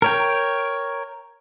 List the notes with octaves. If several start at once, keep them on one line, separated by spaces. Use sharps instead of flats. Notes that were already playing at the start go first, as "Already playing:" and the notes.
A#4 C#5 G5